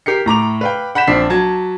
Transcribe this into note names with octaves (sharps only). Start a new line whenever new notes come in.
G4 A#4 C7 C#7
A2 A#5 D6 F7
B4 F5 G5
F#5 B5 G6 B6 E7
A#1 C4 D4 B6 C7
F#3 A5 G#6